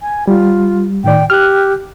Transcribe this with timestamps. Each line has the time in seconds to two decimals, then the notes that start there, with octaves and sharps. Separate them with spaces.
0.02 G#5
0.28 G3 F4
1.04 A2 D#3 D5 G5
1.30 G4 F6 F#6